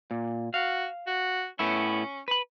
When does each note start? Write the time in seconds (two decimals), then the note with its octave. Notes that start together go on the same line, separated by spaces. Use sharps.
0.11 A#2
0.54 F#4 F5
1.07 F#4
1.59 A2 B3 C#4 E4
2.28 B4 B5